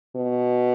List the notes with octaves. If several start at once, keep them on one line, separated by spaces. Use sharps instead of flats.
B2